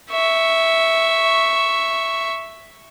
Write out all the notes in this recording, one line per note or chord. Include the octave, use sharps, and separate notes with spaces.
E5 C#6